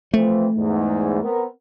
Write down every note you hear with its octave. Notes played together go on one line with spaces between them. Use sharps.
E3 F3 A3 C4
E2 G#2
B3 C4 A#4